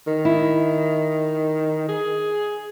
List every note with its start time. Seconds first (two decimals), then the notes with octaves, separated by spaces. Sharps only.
0.07 D#3
0.25 E4
1.88 G#4